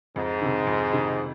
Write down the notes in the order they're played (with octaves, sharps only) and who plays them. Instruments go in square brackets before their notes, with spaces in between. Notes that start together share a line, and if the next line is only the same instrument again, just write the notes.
[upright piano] F2 [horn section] G#2
[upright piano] C3 D#3
F2
C3 D#3